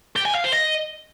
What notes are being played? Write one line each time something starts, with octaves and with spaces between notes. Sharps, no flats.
G4
G#5
F5
C5
D#5